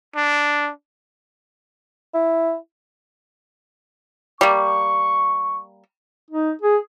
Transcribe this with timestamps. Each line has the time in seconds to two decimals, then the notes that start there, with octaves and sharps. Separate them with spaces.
0.16 D4
2.14 E4
4.41 G3 A#3 C#6
6.31 D#4
6.62 G#4